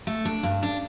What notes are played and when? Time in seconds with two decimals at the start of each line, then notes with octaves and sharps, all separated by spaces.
0.07 A3
0.25 D4
0.43 G2
0.63 D4